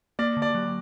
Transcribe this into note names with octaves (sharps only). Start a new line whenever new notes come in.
A#3 D5
D3
D5
F#3